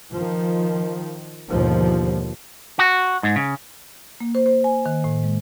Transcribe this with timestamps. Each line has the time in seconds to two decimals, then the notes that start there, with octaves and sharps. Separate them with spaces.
0.11 D#3 F3
1.48 D#2 G#2 B2 D3 F3
2.79 F#4
3.23 G#2
3.36 C#3
4.20 A#3
4.35 C5
4.46 C5
4.64 G#5
4.86 D#3
5.04 A2
5.24 G#3